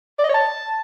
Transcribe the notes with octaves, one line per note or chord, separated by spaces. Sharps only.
D5
D#5
C#5
A5